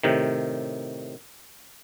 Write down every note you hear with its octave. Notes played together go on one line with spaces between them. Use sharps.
A2 C3 D#3